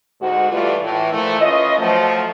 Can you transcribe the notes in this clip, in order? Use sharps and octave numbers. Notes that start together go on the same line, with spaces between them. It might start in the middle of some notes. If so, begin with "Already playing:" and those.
D2 G#2 G#3 F#4
E3 G3 A3 F4
A2 E3
A#2 E3 F3 A3
C#4 F4 B4 D#5
F3 F#3 A3